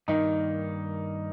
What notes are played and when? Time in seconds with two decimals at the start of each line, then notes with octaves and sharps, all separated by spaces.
0.08 G2 D#3 A#3 D#4